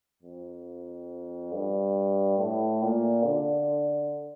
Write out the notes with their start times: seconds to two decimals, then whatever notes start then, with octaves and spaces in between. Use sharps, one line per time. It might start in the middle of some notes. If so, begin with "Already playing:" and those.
0.22 F2
1.52 G2
2.38 A2
2.82 A#2
3.25 D3